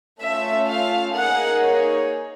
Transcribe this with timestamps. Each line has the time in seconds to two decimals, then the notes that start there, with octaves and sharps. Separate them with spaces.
0.20 A3 C#4 F4 A4 E5
0.68 F5
1.14 A#3 D#4 G#4 F#5
1.61 C#5